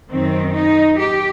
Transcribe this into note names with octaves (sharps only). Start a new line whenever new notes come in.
F#2 D#3 C4
D#4
G4